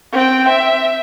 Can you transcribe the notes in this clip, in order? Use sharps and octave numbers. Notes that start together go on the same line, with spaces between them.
C4 G5
E5